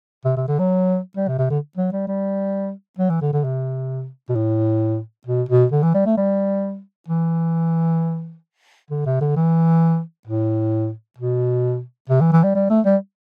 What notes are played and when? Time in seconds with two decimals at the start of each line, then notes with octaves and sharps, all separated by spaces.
0.25 C3
0.36 C3
0.48 D3
0.59 F#3
1.16 G3
1.28 C3
1.38 C3
1.50 D3
1.77 F#3
1.92 G3
2.07 G3
2.98 F#3
3.10 E3
3.21 D3
3.33 D3
3.44 C3
4.29 B2
4.35 A2
5.27 B2
5.49 B2
5.72 D3
5.83 E3
5.94 G3
6.06 A3
6.17 G3
7.08 E3
8.90 D3
9.06 C3
9.21 D3
9.36 E3
10.27 A2
11.18 B2
12.10 C3
12.21 E3
12.32 E3
12.44 G3
12.55 G3
12.70 A3
12.85 G3